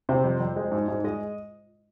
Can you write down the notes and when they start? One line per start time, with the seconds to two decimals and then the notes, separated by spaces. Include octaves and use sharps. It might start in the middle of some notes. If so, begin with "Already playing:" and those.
0.09 C3 C5
0.24 F2
0.40 F2
0.56 G#3
0.72 G#2
0.88 G#2
1.04 G#3 D#5